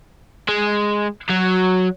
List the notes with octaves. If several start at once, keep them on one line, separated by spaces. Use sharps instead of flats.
G#3
F#3